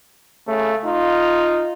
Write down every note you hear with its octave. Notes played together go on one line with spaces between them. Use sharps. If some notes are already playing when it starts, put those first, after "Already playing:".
C#3 A3
D#4 F4